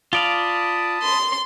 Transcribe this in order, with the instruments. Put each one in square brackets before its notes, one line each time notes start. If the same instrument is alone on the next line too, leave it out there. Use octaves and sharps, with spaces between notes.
[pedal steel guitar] F4 D5 F5 [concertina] A5 B5 D#6
[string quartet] C6